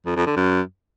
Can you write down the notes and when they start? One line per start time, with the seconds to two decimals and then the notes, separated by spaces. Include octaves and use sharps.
0.06 F2
0.16 F2
0.26 D3
0.36 F#2